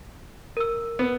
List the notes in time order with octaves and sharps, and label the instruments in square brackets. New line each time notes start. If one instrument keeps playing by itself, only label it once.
[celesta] A#4 E6
[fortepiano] B3